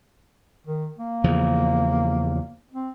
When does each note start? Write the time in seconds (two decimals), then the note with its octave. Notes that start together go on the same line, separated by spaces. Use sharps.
0.67 D#3
0.98 A#3
1.24 E2 C#3 F3
2.72 C4